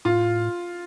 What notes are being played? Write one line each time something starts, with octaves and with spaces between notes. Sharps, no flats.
A2 F4